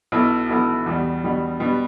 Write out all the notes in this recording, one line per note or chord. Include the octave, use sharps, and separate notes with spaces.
B1 B2 B3 E4 A4
B1 B2 B3 E4 A4
E2 B2 G3
E2 B2 G3
B2 G3 B3